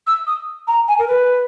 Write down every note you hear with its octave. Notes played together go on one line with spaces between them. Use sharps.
E6
D#6
A#5
G#5
A#4
B4